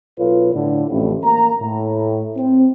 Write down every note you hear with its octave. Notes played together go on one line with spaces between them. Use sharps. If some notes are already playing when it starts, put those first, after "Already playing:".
B1 F4 A4 B4 C#5
A2 D3
A1 F2 A2 C3 C#4
A#3 A#5
A2
C4